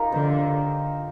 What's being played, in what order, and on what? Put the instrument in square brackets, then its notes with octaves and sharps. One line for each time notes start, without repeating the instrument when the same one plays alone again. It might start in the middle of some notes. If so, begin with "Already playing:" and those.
Already playing: [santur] D#4 F4 G4 A#4
[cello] D3 [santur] C5